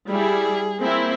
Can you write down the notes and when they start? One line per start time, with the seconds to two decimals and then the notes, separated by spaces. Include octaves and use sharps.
0.11 G3 E4 G#4
0.80 A#3 C4 E4